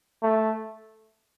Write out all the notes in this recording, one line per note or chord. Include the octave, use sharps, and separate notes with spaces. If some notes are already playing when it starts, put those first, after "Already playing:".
A3